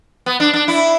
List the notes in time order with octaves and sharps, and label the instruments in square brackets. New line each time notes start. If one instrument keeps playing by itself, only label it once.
[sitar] B3
D4
D4
E4